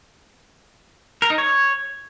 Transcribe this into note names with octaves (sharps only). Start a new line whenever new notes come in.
A#4
D#4
C#5